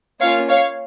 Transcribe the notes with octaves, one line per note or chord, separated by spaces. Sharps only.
A#3 C#4 F4 C#5 F5
C#5 F5